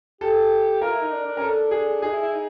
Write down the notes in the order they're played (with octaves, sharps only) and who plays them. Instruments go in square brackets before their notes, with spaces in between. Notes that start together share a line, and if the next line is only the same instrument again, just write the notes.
[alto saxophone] G4 [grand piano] A4
[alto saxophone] F4 [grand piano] A#4
[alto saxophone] E4
D#4
D4
D4
[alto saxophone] C#4 [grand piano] A4 A#4
[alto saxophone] D4
[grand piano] G#4
[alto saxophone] D#4 [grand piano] G#4
[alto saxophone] E4
E4
D#4